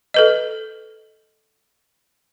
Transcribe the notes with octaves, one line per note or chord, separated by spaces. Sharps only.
A4 B4 D#5